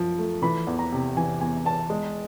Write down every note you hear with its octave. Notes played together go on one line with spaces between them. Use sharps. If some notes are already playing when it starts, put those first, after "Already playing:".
Already playing: F#2 F3
A3
E3 B5
E2
A#5
C3
E3 G#5
E2 G#5
E2 A5
G#3